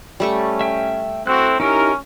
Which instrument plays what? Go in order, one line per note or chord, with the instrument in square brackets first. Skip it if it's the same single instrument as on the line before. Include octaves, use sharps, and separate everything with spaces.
[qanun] G3 A3 C#6 [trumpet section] C#4
[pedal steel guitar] E5 G5
[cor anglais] C4 [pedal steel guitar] E4 A4 F#6 [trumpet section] F#4
[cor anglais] C#4 [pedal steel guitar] D#4 E4 G4 [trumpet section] A#4